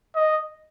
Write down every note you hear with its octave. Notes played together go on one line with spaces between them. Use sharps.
D#5